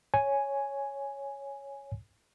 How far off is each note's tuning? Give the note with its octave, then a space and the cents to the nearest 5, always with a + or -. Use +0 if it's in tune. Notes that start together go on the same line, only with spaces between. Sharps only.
C#5 +0 G#5 +0